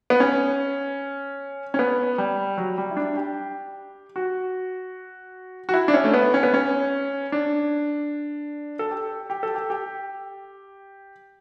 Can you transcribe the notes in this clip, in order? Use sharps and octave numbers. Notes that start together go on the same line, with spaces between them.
B3
C#4
C#4
B3
G3
F#3
G3
E4
D4
G4
F#4
F#4
E4
D4
C#4
A3
B3
C#4
B3
C#4
D4
A4
G4
G4
A4
G4
G4